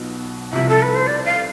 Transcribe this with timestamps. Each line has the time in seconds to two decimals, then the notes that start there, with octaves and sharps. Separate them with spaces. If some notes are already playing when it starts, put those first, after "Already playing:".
Already playing: B1 B2 B3 F4
0.53 C2 C3 F3 E5
0.69 A4
0.82 B4
0.95 C5
1.07 D5
1.25 F5